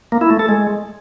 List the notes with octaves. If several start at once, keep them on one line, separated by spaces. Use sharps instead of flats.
A#3
E4
A3
A4
G#3